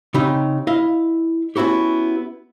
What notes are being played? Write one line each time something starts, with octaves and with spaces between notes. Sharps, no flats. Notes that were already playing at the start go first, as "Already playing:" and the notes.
C#3 C4 D#4 G4 B5
E4 D#5 F5
B3 C#4 E4 F#4 G4